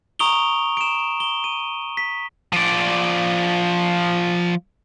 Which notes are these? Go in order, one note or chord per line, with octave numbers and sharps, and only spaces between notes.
A#5 C#6 D#6 D7 F7 G7
D7 E7
G7
D#7
B6
F3 D5